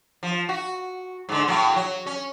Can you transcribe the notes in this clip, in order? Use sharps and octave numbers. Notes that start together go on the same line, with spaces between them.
F3
F#4
G#2 D3
A2 F#3
F#3
C#4